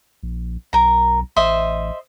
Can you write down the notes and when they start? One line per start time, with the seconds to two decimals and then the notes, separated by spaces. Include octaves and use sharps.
0.23 A#1
0.73 B1 A#4 A#5
1.36 A1 C5 D#5 E5